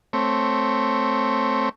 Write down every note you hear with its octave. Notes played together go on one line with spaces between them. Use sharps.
A3 C4 C#5